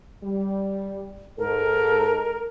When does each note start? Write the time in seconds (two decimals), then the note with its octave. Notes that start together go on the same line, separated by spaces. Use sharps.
0.24 G3
1.38 G#2 A4 A#4